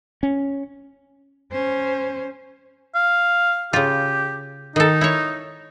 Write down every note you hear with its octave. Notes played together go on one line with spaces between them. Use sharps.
C#4
C#4 C5
F5
C#3 F4 G4
D#3 D#4 A4
E4 C#5